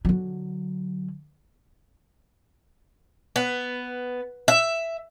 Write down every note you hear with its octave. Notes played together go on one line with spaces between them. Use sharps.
D3 F#3
B3
E5